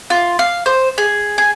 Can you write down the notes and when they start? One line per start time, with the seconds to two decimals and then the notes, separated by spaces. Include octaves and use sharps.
0.10 F4
0.39 F5
0.66 C5
0.98 G#4
1.38 G#4